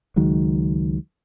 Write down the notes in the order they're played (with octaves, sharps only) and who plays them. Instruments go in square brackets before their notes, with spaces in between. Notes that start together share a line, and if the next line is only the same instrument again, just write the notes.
[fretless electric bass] C#2 D#3 F#3 G#3